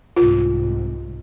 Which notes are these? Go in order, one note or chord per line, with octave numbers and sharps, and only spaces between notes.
C2 G#2 C3 F4